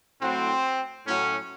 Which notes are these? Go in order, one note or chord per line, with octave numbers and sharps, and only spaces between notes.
A2 F#3 C4
A2 F#3 C#4